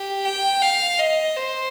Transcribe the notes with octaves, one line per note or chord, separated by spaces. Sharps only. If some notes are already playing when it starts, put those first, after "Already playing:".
Already playing: G4
G5
F5
D#5
C5